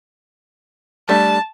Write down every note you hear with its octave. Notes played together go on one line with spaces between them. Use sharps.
G3 A3 D4 A5